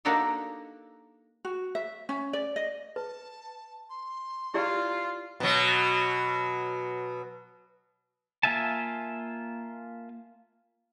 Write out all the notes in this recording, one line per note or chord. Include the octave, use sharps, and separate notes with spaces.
A#3 D4 D#4 F#4 G4 A4
F#4
E5
C#4
D5
D#5
B4 A5
C6
E4 F4 G4 D5
B2 F#3
A#3 F4 E5 G#5 A5